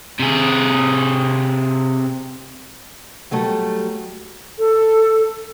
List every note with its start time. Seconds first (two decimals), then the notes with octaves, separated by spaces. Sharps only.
0.19 C3 G#4
3.31 F#3 G3 A3
4.58 A4